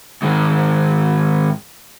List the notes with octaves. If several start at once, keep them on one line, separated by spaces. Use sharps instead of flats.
G#2 D#3